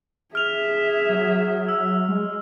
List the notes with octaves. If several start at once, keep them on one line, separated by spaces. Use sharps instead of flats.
G#4 E5 F6 F7
F#3
E6
G#3